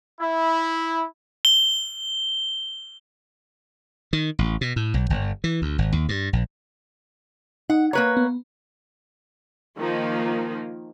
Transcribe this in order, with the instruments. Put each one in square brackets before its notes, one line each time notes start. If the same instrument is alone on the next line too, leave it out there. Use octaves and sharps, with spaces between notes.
[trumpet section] E4
[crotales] G7
[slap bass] D#3
A1
B2
A2
B1
G1
E3
D2
G#1
D#2
G2
A#1
[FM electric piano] D#4 [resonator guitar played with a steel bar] F#5
[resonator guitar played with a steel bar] A#3 B4 C#5 [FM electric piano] A#5
[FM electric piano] B3
[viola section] D#3 F3 A#3 D#4